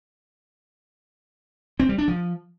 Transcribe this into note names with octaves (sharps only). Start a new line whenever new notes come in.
C4
G3
D4
F3